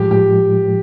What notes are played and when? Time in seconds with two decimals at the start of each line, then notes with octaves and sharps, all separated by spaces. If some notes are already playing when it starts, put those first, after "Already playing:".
Already playing: A2 F3 G#3 G4
0.11 G4